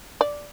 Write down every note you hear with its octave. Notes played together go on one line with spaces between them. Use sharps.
D5